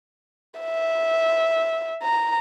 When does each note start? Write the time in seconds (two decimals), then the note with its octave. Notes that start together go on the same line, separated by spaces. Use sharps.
0.60 E5
2.03 A#5